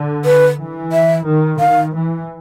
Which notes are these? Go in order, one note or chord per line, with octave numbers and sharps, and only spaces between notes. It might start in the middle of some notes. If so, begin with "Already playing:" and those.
Already playing: D3
B4
E3
E5
D#3
D#3 F5
E3